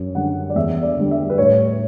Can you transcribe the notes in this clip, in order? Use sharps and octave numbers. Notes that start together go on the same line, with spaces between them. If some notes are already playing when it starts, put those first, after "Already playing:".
Already playing: F#2
D3 G3 F#5
D5
E2 E5
D5
D3 G3
E5
B4
A2 C#5